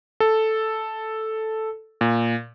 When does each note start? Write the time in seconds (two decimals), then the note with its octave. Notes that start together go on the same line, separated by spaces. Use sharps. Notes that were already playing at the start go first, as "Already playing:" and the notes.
0.20 A4
2.01 A#2